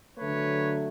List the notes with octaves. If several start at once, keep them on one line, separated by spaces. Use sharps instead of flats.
D3 F#3 A3 B4 C#5